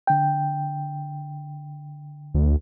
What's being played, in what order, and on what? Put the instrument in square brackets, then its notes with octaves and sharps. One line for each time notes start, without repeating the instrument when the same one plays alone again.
[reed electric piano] D3 G5
[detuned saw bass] D2